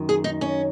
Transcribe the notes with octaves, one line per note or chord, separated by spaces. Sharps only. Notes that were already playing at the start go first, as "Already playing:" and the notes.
Already playing: F#2 D#3
G#4
D#4
C#4